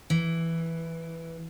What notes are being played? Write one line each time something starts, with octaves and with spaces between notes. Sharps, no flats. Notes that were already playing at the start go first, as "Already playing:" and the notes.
E3